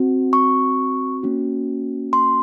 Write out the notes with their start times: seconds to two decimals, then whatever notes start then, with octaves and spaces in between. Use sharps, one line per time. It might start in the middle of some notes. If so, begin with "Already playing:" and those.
Already playing: C4 F#4
0.33 C#6
1.23 A#3 C#4 F#4
2.13 C6